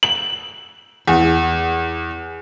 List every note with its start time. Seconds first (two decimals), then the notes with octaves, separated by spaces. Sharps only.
0.03 F#7
1.08 E2